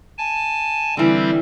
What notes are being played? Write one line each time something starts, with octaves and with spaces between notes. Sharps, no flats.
G#5 A5
D3 E3 G3 C4